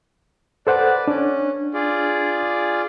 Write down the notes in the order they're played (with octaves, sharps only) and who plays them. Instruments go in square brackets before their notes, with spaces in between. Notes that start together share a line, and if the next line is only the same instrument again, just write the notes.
[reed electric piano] A4 C5 F#5 [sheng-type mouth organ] B4 D5
[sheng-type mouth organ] C#4 [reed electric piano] D4
[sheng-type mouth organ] F4 G#4 D5